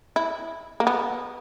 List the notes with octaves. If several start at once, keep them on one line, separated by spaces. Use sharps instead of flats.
E4
A#3
B3